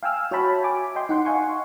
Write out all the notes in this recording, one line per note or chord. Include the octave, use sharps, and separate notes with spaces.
F5 G5 G#5 E6 F6
F#4 C#5 E5 G5 A5 B5
G#5 D6
D#5 G5 C6
D#4 F#5 C6
D#5 F5 F#5 G#5 C6 C#6